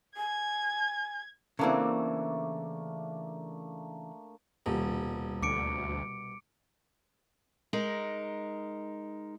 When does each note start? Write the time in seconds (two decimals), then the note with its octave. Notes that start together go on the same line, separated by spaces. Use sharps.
0.17 G#5 G#6
1.59 C#3 E3 A3 A#3 C4 D4
4.66 D#1 C2 B2
5.42 D2 D6 C#7 D7
7.73 G#3 D#4 A#4